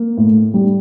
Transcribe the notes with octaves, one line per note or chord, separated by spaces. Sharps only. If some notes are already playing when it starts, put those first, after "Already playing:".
Already playing: A#3
A2
G3